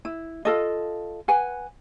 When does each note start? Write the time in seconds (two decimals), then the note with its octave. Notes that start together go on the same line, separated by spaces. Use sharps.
0.05 E4
0.45 F4 A4 D#5
1.28 B4 F#5 G#5